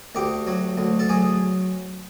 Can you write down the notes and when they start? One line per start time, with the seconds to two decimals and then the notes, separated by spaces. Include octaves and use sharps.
0.15 D2 G4
0.47 F#3
0.77 D2
0.99 A4
1.09 F#3 G#4